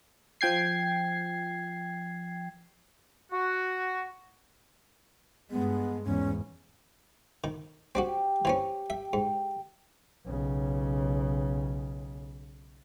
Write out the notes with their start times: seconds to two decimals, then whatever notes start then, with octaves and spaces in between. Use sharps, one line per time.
0.41 F3 G5 G#6 C7
3.31 F#4
5.51 G2 G#3 B3
6.05 E2 G#2 C#4
7.44 D#3
7.95 C4 D4 F#4 G4
8.45 E3 C4 C#4
8.90 E5 G5
9.13 G#2
10.26 B1 C#3